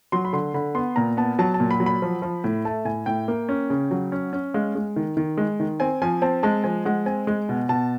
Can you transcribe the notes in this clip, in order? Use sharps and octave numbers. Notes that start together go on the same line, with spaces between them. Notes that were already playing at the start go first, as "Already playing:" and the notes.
F#3 C6
B5
D3 C6
D3 B5
B3 C6
A#2 A#5
B3 A5
F#3 A5
A5
A#2
B5
F#3
B5
F3
F3
A2
A3 A5
A2 G#5
A2 G5
A#3
C#4
C#3
F#3
C#4
C#4
G#3 F5
G#3
D#3
D#3
G#3
D#3
C4 G#5
F3 G#5
C4 A5
G#3 A5
F3 G#5
G#3 F#5
C4 G#5
G#3
B2
B2 A5